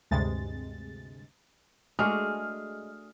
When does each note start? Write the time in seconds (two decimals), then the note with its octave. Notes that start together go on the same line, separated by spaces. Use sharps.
0.11 D2 G2 C3 G#3 A6
1.99 G#3 A3 D4 F#4 G#4 F6